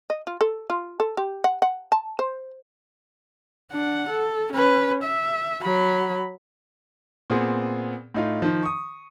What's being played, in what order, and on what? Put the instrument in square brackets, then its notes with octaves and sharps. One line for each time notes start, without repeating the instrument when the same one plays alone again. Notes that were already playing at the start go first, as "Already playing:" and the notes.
[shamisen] D#5
F4
A4
F4
A4
G4
F#5
F#5
A5
C5
[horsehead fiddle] D4 F#5
A4
C#4 B4
E5
F#3 B5
[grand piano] A#2 B3 C4 G#4
A2 D#4 F4
D#3 F3
C#6 D#6